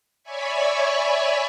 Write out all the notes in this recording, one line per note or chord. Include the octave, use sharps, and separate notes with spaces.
C#5 D5 E5 G#5 B5 C#6